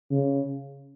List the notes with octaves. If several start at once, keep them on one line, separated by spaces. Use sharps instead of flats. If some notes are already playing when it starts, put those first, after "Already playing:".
C#3